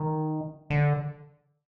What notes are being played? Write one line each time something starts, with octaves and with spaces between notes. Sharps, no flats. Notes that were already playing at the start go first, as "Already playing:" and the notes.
Already playing: D#3
D3